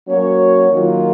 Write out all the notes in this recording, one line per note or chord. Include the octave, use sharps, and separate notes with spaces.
F#3 A#3 C#4 F#4 C#5
D#3 F#3 A#3 F4